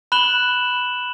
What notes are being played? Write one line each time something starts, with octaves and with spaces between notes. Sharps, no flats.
B5 F#6 E7 F#7 G7